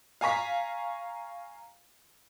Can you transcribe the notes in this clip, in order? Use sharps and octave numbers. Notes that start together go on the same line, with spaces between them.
F5 G#5 A#5 C#6 B6